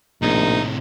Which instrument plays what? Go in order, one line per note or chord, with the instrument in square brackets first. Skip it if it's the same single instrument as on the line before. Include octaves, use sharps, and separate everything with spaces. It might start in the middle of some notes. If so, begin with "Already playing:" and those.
[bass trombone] A#1 [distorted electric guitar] A2 C3 [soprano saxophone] D#4